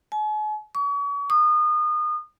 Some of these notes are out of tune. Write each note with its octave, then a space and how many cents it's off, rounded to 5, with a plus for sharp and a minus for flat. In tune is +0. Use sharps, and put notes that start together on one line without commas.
G#5 +45
C#6 +40
D#6 -30